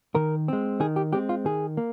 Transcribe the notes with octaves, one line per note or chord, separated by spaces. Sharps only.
D#3 A#4
G#3 C4
D#3 G#4
G4
G#3 C4 G4
F4
D#3 G#4
A#3